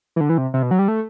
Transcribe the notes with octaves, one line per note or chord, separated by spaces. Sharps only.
E3
D3
E3
C3
C3
B2
F#3
G3
A3